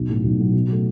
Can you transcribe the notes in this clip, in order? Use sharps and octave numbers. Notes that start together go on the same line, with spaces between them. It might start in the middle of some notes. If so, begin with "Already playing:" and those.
Already playing: B1
A2 F#3
B1
A2 F#3
B2
F#3 A3